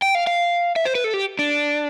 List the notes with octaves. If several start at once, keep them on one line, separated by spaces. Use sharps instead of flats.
G5
F5
F5
E5
C5
B4
A4
G4
D4